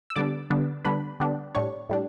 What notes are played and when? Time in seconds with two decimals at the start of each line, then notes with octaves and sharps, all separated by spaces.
0.10 E6
0.16 D3 G3 B3 D4 D5 D6
0.50 D3 G3 B3 D4
0.85 D3 G3 B3 D4 B4 B5
1.20 D3 G3 B3 D4
1.55 A2 G3 D4 C#5 C#6
1.89 A2 G3 D4